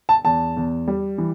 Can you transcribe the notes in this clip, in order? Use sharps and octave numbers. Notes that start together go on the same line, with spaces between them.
A5
E2 A5
E2
G3
E3